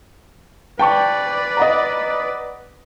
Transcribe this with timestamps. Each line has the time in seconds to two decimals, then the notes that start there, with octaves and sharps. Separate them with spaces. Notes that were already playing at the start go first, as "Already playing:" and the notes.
0.79 B4 D5 G5 A5 C#6
1.57 D#5 F#5 A#5